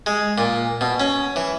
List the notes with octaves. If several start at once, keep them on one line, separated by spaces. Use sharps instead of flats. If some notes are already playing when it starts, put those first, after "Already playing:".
G#3
A#2
B2
C#4
E3